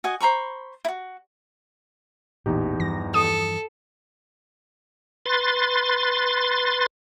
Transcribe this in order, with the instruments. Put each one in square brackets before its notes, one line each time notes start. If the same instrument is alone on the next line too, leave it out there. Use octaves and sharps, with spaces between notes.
[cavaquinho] F#4 D#5 G#5
C5 A#5 B5 C#6
E4 F#4
[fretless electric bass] A1 A#2 [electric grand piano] E2 D#4 G4
[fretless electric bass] G2 E3 F3 [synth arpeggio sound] A#6
[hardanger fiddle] A4 [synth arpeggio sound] D#6
[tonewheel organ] B4 C6 A6